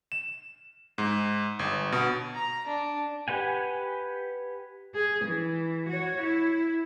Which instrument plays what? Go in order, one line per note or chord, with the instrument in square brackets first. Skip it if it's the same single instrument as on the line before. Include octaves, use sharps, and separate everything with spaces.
[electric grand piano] E7
G#2
G1
B2
[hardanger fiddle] A#5
D4
[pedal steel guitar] G4 B4 F#5 G#5
[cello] G#4
E3
F#4 C#5
E4